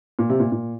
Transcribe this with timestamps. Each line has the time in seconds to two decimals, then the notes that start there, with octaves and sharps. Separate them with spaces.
0.19 A#2
0.29 C3
0.40 A#2
0.52 A#2